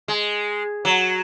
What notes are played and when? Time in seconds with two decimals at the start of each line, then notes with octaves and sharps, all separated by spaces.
0.08 G#3
0.85 F#3